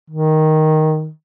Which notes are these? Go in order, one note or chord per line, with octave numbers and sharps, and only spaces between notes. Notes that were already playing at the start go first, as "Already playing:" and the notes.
D#3